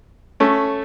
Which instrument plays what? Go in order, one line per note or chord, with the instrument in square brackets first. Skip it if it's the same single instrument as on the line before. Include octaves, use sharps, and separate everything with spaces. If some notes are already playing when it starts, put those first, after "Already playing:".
[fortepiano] A3 C#4